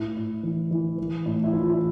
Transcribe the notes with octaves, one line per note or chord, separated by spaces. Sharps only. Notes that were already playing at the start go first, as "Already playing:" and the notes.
Already playing: A2 E4
A2
E3
E3
E3
A2
E4
E3 F4
E4